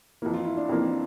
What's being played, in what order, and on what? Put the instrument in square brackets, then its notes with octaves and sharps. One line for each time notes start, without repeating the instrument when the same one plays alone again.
[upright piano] F2 E3 A#3 [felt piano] E4
[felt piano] F4
E4
D4
[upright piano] F2 E3 A#3 [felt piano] C4